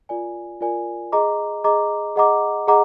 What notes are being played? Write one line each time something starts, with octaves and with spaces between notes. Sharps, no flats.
F4 A#4 D5 G#5
F4 A#4 D5 G#5
G#4 D#5 A#5 D6
G#4 D#5 A#5 D6
G#4 D#5 F#5 A#5 D6
G#4 D#5 F#5 A#5 D6